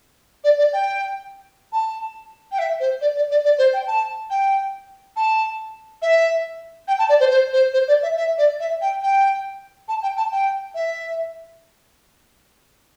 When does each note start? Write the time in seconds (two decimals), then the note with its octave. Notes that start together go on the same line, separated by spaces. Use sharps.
0.44 D5
0.58 D5
0.73 G5
1.73 A5
2.52 G5
2.59 E5
2.80 C5
3.01 D5
3.16 D5
3.31 D5
3.45 D5
3.58 C5
3.73 G5
3.87 A5
4.30 G5
5.16 A5
6.02 E5
6.88 G5
6.99 A5
7.09 D5
7.20 C5
7.30 C5
7.53 C5
7.74 C5
7.88 D5
8.03 E5
8.17 E5
8.38 D5
8.60 E5
8.81 G5
9.03 G5
9.88 A5
10.03 G5
10.17 A5
10.32 G5
10.75 E5